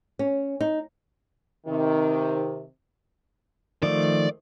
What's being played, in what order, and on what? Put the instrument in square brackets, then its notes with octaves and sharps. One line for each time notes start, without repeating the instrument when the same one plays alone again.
[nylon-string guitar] C#4
D#4
[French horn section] C3 D#3
[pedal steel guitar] D#3 F3 A3 [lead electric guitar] D5